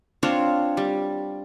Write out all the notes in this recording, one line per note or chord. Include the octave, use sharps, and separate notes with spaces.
C4 D4 F4 C#5
G3